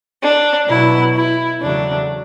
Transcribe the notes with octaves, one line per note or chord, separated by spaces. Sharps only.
D4
B2 F#3 B3 E4
E4
E2 C#3 F#3 A3 D4